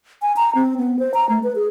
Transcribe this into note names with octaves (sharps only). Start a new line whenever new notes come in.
G#5
A#5
C4
B3
C5
A#5
A3
B4
G#4